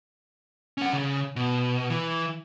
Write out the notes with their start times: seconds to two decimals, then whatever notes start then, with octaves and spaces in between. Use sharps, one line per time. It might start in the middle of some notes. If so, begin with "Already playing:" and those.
0.78 C#4 F#5
0.93 C#3
1.36 B2
1.90 E3